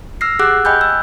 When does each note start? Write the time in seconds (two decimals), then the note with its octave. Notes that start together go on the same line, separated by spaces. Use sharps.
0.21 E6 F6 A#6 C7
0.39 G4 G#4 F#5 D6 E6 F#6
0.65 D#5 G5 G#5 B5 F#6 G6
0.81 E6